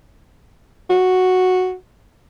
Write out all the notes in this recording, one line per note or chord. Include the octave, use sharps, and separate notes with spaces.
F#4